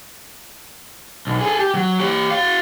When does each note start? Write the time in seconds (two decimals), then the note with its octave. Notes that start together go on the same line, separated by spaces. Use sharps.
1.27 B1
1.41 G#4 A4
1.59 G4
1.75 F#3
2.00 G4 C#5
2.31 F#4 F5